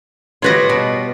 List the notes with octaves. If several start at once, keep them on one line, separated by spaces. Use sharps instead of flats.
G3 F4 F#4 B4 C#5 D#5
B2